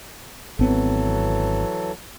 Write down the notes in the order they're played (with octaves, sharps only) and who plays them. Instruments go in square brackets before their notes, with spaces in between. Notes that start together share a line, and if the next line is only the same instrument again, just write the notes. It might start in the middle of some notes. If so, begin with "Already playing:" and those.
[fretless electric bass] G#1 B3 C4 [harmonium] E3 F#3 A4